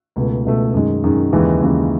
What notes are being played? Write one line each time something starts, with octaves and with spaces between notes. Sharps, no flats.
C#2 B2 A3
C#2 B2 A3
F#2 D#3 G#3
F#2 D#3 G#3
D#2 C#3 E3 G#3
D#2 C#3 E3 G#3